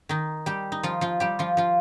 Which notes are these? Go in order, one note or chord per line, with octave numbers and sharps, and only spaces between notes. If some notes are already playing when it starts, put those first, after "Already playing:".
D#3 D#4
G3 G4
D#4
F3 F4
F3 F4
G3 G4
F3 F4
F3 F4